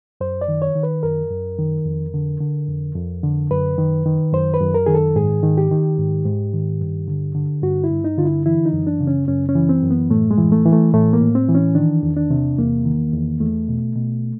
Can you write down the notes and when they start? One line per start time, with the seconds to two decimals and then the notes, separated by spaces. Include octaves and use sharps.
0.21 F#2 C5
0.41 D5
0.48 D#3
0.62 C#5
0.75 D#3
0.83 B4
1.03 F#2 A#4
1.30 F#2
1.58 D#3
1.85 F2
2.14 D3
2.41 D3
2.68 F2
2.96 F2
3.23 D3
3.51 F#2 B4
3.78 D#3
4.06 D#3
4.33 F#2 C5
4.54 B4
4.60 F#2
4.74 A#4
4.86 D#3 G#4
4.95 A4
5.16 G#2 G#4
5.43 D#3
5.58 G4
5.71 D#3
5.99 G#2
6.26 G#2
6.54 D#3
6.81 G2
7.08 D3
7.35 D3
7.63 G2 F#4
7.84 E4
7.91 G2
8.04 D#4
8.18 D3 F4
8.25 E4
8.46 E3 E4
8.66 D#4
8.73 F#2
8.87 D4
9.00 C#3
9.07 C#4
9.28 F#2 C#4
9.49 C#4
9.56 E3
9.69 C4
9.83 F#2
9.90 B3
10.10 A2 A3
10.31 G#3
10.38 E3
10.52 A3
10.66 E3
10.72 A3
10.93 A2 A3
11.13 A#3
11.21 A2
11.35 C4
11.49 E3
11.55 C#4
11.75 D#3 D4
12.03 E2
12.17 D4
12.30 C3
12.58 E2 A#3
12.85 D#3
13.13 E2
13.40 E2 A3
13.69 B2
13.96 B2